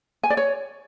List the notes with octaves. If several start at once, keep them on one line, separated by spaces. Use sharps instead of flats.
G#5
D5
C#5